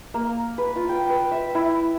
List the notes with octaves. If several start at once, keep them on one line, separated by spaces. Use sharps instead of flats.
A#3
B4
F4
G5
B4
E5
E4